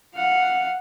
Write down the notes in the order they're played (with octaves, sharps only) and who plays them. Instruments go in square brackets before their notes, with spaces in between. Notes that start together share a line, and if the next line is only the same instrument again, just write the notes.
[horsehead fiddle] F5 F#5